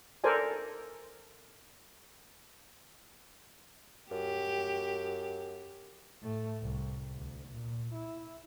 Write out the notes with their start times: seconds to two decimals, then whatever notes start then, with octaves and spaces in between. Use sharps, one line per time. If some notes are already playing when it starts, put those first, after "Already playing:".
0.24 A4 A#4 C5 D5 G#5
4.11 F#2 G4
6.22 A2 A3
6.61 C2
7.16 D2
7.49 A#2
7.94 E4